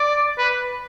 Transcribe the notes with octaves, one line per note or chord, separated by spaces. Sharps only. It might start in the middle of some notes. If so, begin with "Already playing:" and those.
Already playing: D5
B4